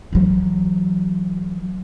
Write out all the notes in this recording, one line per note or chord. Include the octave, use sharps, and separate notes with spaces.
E3 F#3